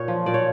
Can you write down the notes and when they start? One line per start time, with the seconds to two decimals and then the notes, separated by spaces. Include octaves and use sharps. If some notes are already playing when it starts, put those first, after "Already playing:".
Already playing: A#2 C#5
0.08 F3
0.26 A#2 D5
0.34 C#5